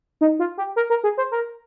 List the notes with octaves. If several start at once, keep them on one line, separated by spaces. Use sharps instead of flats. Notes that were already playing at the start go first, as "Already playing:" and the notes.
D#4
F4
G4
A#4
A#4
G#4
C5
A#4